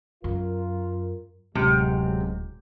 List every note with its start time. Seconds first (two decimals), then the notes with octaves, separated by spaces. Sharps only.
0.24 F#2 F4 A#4
1.55 D1 C3 F#3 G#3